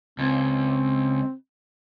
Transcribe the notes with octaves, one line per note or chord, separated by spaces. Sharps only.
C#2 C4